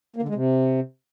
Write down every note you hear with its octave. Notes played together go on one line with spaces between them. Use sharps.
A#3
D3
G#3
C3